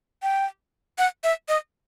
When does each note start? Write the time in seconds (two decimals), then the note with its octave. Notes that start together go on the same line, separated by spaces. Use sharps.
0.23 G5
0.98 F#5
1.24 E5
1.49 D#5